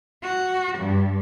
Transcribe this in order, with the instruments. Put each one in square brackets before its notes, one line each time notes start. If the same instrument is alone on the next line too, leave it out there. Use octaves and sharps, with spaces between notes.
[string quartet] F#4
G2